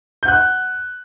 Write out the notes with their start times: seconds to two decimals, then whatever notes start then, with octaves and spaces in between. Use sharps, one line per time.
0.23 G6
0.25 F#5
0.28 F#6